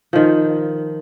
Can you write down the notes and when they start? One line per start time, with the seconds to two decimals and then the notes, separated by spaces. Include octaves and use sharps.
0.13 D#3 F3